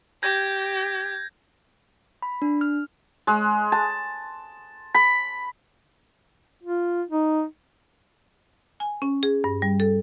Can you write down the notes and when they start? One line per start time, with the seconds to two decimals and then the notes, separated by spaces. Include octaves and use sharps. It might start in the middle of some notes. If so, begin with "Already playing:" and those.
0.23 G4 G6 G#6 A#6
2.22 B5
2.42 D4
2.61 F6
3.27 G#3
3.72 A5
4.94 B5
6.62 F4
7.09 D#4
8.80 G#5
9.02 C#4
9.23 G#4
9.44 G2
9.62 G3
9.80 A4